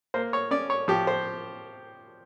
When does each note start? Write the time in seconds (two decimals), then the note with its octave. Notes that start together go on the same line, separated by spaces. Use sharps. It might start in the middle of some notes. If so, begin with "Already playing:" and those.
0.14 A#3 C5
0.33 C#5
0.51 C#4 D5
0.70 C#5
0.88 F3 G4
1.07 C5